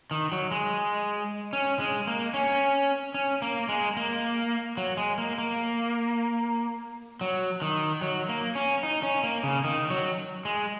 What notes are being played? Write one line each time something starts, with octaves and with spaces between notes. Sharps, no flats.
D#3
F#3
G#3
C#4
G#3
A#3
C#4
C#4
A#3
G#3
A#3
F#3
G#3
A#3
A#3
F#3
D#3
F#3
A#3
C#4
D#4
C#4
A#3
C#3
D#3
F#3
G#3